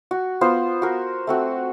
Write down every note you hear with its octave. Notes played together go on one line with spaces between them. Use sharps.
F#4
B3 F4 C5
F#4 A#4
A3 C4 F#4